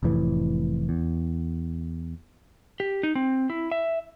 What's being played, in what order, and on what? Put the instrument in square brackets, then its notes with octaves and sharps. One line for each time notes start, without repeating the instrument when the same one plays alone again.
[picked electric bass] F1 F2 A2 E3
E2
[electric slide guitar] G4
D#4
C4
E4
E5